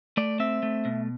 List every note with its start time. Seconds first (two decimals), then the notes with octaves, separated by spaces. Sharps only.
0.17 A3 D5
0.40 C4 E5
0.63 A3
0.85 B2